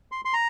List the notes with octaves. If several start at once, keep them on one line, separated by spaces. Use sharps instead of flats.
C6
C6
A#5